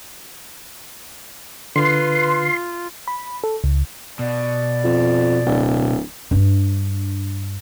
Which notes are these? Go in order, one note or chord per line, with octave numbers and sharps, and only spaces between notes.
D3 F4 B4 C6
B5
A4
C#2
B2 D5
F2
D1
G2 D4